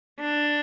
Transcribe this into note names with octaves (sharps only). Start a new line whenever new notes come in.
D4